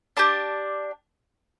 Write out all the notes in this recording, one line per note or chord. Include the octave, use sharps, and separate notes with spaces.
D4 G4 A5